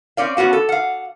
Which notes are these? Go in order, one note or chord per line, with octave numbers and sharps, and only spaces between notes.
C4 C#4 D5 F5
B3 C#4 F#4 F5
A4
F5 F#5